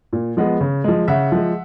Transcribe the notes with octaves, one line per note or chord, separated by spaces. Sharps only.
A#2
F3 G#3 B3
C#3
F3 G#3
C#3 E5 F#5
F3 G#3